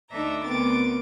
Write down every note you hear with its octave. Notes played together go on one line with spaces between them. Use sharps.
D2 D4 D#4 A4 E5 A#5
D2 B3 C4 A#4 D6 A6